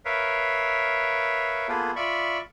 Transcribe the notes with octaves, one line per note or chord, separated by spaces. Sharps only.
A#4 B4 C#5 E5 F5
A#3 B3 F4 G#4 A4 B4
F4 D5 E5 B5 C#6